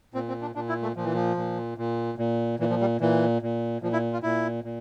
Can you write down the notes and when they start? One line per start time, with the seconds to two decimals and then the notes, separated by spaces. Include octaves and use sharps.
0.14 A#2 C4
0.28 C4
0.42 D4
0.55 A#2 D4
0.69 E4
0.83 A3
0.96 A#2 F3
1.04 E3
1.14 F3
1.37 A#2
1.78 A#2
2.18 A#2
2.60 A#2 E3
2.70 F3
2.81 G3
3.01 A#2 E3
3.42 A#2
3.82 A#2 F3
3.93 E4
4.13 F4
4.23 A#2 E4
4.64 A#2